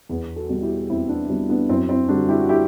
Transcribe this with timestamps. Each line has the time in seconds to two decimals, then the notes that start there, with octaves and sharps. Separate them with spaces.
0.09 E2 B3
0.36 F#4 A4
0.49 B2 G3
0.62 E4 G4
0.90 E2 C4 E4
1.09 B3 D4
1.29 B2 G3 C4
1.49 B3 D4
1.69 F#2 C4 E4
1.89 C4 E4
2.09 D3 G3 D4 F#4
2.29 E4 G4
2.39 F#4
2.49 E4 G4